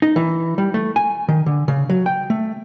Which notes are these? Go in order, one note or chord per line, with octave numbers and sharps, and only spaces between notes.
D#4
E3
G3
A3
G#5
D#3
D3
C#3
F#3
G5
A3